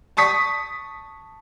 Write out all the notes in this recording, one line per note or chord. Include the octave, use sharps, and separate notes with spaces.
A5 C#6 D#6 B6